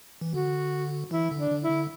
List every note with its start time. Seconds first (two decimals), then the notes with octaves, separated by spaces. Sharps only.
0.21 E3
0.34 D3 F#4
1.11 E3 E4
1.31 D3
1.38 D4
1.50 D3
1.64 E4
1.70 D3